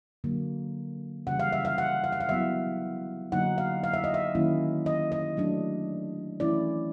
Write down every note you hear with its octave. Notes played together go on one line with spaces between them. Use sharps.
D3 F#3 A#3
C#3 E3 G3 F#5
F5
E5
F5
F#5
F5
F#5
F5
F#3 B3 E4 E5
D3 F#3 A#3 D#4 F#5
F5
F5
E5
D#5
E5
D#3 F#3 A#3 C#4 E4
D#5
D#5
F#3 A3 D4
E3 A3 C#4 E4 D5